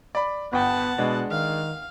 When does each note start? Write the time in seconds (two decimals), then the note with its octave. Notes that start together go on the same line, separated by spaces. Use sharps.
0.15 D5 B5
0.53 G1 B3 F#5 G5 A5
0.98 B2 G#3 D4
1.31 D#3 F5